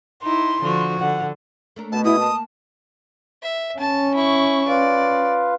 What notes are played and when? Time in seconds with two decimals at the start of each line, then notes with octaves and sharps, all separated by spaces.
0.23 D#4 E4 C6
0.61 D3 F3 F#4
1.00 D3 F#5
1.76 A3 D4 A#4
1.92 B2 A5
2.05 B2 A#3 E4 D#6
2.20 A5
3.43 E5
3.79 C#4 A5
4.15 E4 C#6
4.68 F4 B4 D5 F5